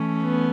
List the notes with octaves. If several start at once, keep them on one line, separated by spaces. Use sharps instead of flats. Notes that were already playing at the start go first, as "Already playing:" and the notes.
Already playing: E3 A3 C#4
B3